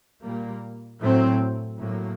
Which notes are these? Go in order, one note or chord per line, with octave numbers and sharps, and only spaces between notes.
A#2 G3 A#3
A2 F#3 C4
A2 F#3 A#3